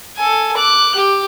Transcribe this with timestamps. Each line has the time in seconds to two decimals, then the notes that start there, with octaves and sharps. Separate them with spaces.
0.16 A4 G#5
0.57 D6 F#6
0.95 G4